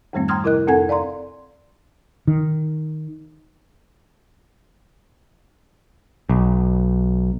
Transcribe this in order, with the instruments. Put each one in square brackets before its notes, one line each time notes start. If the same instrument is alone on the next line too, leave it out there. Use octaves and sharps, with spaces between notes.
[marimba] F2 G#2 D#3 G3 A3 C4
G5 A#5 C6 D#6 F6 G#6
C3 E4 A#4 D#5 F#6
F2 C4 A4 F#5 G#5 G#6
D5 F5 A#5 C6
[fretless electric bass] D#3
[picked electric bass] B1